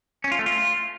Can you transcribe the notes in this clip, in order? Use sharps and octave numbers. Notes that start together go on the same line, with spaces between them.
C#4
F4
A3
F4